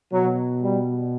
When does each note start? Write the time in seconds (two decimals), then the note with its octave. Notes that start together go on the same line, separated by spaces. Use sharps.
0.13 B2 F#3
0.62 G3